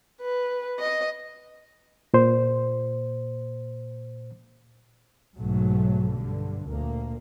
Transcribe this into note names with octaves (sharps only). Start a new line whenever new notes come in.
B4
D#5
A#2 C5
B1 G#2 F#3 A3
G2 D3
D2 A#2 A#3